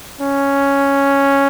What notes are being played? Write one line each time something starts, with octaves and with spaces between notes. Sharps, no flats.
C#4